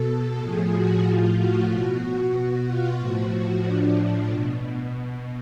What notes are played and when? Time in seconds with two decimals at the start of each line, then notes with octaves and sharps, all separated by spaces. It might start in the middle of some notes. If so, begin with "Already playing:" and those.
Already playing: B2 A4
0.40 A2 F3 G#4
0.73 F#4
1.05 A2 F3 F4
1.37 F#4
1.70 B2
2.34 B2 F#4
2.66 F4
2.99 A2 F3 F#4
3.63 A2 F3 D4
4.28 B2